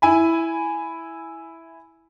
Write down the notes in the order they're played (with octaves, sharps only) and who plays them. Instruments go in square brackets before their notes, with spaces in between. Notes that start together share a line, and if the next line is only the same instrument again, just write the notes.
[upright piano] E4 G#5 B5